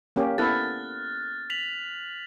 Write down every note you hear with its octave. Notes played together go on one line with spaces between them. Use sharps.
A#3 C#4 G4
B3 E4 A4 F6 F#6 A6
B6 F7 F#7